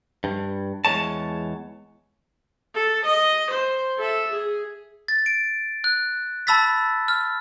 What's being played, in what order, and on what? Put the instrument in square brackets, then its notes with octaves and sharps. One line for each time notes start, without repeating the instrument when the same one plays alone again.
[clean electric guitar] G2
E2 G#2 G#3 C#5 A5
[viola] A4
D#5
C5
A4 E5
G#4
[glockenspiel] A6
D7
F#6
A5 B5 E6 A6 B6
F6